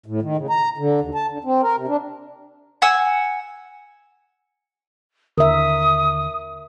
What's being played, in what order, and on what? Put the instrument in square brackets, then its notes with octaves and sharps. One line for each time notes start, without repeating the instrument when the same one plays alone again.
[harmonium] A2
D#3
C#3
A#5
D3
D#2
A5
D3
C4
A#4
C3
D4
[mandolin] F#5 G#5 E6
[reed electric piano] D#2 D3 [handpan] A#4 E5 [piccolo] D#6